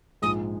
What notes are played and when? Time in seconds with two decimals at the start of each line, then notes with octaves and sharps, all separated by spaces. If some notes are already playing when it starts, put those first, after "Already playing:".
0.22 A#1 G#2 F3 G#3 D#6